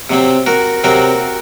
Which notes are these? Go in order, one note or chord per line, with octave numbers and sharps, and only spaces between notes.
C3 F#3 C4
F#4 A#4
C3 F#3 C4 F#4 A#4